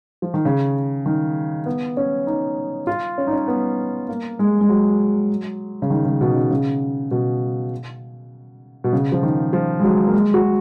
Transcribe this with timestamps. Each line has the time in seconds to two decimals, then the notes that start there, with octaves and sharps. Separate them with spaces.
0.22 F3
0.34 D#3
0.45 C#3
1.06 D#3
1.66 B3
1.97 C#4
2.27 D#4
2.87 F4
3.18 C#4
3.27 D#4
3.33 C#4
3.48 B3
4.09 A#3
4.39 G#3
4.61 G#3
4.69 F#3
5.82 C#3
5.90 D#3
6.05 C#3
6.21 B2
6.30 D#3
6.35 C#3
6.51 C#3
7.11 B2
8.84 B2
8.93 C#3
9.12 F3
9.23 D#3
9.53 F3
9.79 G#3
9.83 F#3
10.07 A#3
10.13 G#3
10.34 F#4